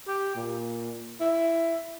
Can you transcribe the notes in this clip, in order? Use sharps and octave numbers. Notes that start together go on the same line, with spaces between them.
G4
A#2
E4